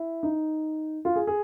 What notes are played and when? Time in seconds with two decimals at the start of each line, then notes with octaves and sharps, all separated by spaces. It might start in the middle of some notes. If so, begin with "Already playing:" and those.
Already playing: E4
0.23 D#4
1.05 F4
1.16 G#4
1.27 G#4